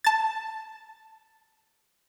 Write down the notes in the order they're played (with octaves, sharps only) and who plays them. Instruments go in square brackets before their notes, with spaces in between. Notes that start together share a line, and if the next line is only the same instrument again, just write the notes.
[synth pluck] A5 A6